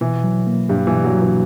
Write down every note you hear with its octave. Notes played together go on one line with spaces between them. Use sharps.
B2 E3
F#3
A#3
G2 G3 D4
E3
B2
F#3
F#3
E3